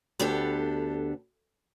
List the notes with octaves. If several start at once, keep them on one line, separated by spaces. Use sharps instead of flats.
D2 B3 D4 G4 A4